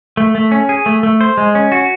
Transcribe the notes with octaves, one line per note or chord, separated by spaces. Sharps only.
A3
A3
C#4
G#4
A3
A3
C5
G#3
C#4
F#4